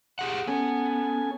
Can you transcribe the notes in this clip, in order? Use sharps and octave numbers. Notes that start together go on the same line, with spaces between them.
G4 G#4 F#5
B3 C#4 A4 G#5